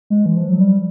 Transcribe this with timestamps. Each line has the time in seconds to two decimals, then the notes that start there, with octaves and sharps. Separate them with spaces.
0.10 G#3
0.26 E3
0.37 F3
0.49 F#3
0.60 G3